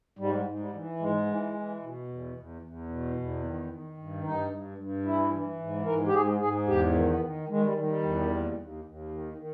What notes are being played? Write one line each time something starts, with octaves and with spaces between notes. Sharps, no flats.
G#2 G3
G#2
G3
E3
G#2 G#3
E3
E3
B2
E2
E2
E2
B2
E2
D#3
D#3
G2
G2 D#4
G2
G2
E3 E4
E3
G#2
G#2 A#4
G4
G#2 G#4
G#2 G#4
E2 G4
D#3
B3
D#3
D#3 G#3
G3
D#3
G3
E2
D#2
D#2
D#2
D#3
D#3